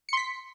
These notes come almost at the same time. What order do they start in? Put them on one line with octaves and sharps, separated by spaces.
C#7 C6 B6